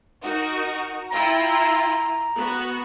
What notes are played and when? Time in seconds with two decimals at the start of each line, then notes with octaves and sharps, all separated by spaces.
0.23 D#4 F#4 A#4
1.11 E4 F4 G5 A#5
2.37 B3 F#4